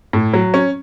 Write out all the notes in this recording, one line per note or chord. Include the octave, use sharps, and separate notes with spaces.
A2
F#3
C#4